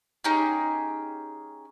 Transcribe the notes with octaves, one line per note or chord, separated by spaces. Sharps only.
C#4 D#4 G4 G#4